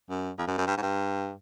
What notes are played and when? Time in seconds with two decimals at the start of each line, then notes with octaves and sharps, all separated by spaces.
0.10 F#2
0.38 F2
0.47 F#2
0.58 F#2
0.67 G2
0.77 G#2
0.82 G2